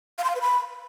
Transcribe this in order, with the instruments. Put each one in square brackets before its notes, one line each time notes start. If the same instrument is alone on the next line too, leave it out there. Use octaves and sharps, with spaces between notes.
[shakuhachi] F5
C6
F5
B4
B5